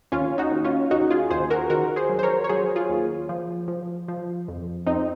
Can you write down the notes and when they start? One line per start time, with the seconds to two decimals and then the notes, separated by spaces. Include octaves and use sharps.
0.12 D#2 C#4 F4
0.38 D#4 F#4
0.51 D#2
0.64 C#4 F4
0.91 D#2 D#4 F#4
1.10 F4 G#4
1.30 D#2 G#4 C5
1.50 F#4 A#4
1.70 D#3 F#4 A#4
1.96 G#4 C5
2.09 F#3
2.19 C5
2.23 A#4 C#5
2.44 C#5
2.49 F#3 G#4 C5
2.76 F4 G#4
2.89 D#2
3.29 F3
3.68 F3
4.08 F3
4.48 F2
4.87 F2 C4 D#4